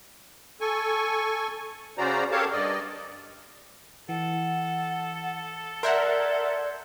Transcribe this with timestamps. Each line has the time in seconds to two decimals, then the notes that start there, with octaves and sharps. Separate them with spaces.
0.61 A4 G#5 C#6
1.98 C#3 C#4 F#4 C5 D5 A#5
2.32 G4 A4 A#4 C#5 F5 A5
2.52 G2 D5 D#5
4.09 E3 A4 F#5
5.83 A#4 D5 E5 F#5 C6 G6 G#6